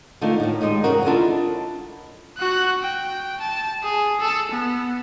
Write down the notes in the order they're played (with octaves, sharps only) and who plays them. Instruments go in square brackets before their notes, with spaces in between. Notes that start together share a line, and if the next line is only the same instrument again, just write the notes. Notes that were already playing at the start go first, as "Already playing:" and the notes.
[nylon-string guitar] D3 D#3 A3 F4
A2 D#3
G3 G#3 D#4
E2 G2 C#3 F#4 A#4
D4 E4 F4 A4 D#5
[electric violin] F#4 F#6
G5
A5
G#4
A4 A5
B3